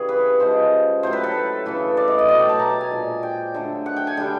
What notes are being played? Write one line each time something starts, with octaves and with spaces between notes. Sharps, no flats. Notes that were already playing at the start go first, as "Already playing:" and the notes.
Already playing: C#3 E3 G3 G#4
B4
C#3 F3 G#3 C5
A2 F#3 A3 C5
B4
A4
C#3 E3 A3
D5
D#5
D#5
B2 F#3 A3 D5
G5
A5
A#5
A5
G#5
A#2 F3 G#3
G5
D3 F#3 A3
F#5
G5
G#5
D3 G3 G5